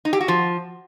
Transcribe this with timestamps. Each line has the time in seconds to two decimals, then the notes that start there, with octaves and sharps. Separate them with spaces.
0.05 D#4
0.13 G4
0.21 F#4
0.28 F3